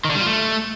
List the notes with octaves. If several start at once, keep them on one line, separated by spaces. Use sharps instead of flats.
D#3
D3
G3
F4
A3